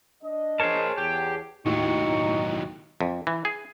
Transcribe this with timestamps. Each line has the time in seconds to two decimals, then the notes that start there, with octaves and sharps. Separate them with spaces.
0.23 D4 D#5
0.60 G#4 A#4 C5 C#5 A5
0.98 E2 G4
1.66 D#2 A2 D#3 F#3 D#4 C#6
3.01 F2
3.27 E3
3.45 G#4